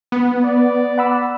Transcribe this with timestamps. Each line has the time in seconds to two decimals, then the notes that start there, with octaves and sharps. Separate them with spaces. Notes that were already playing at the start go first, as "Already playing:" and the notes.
0.12 B3
0.44 D5
0.98 F#5 B5 E6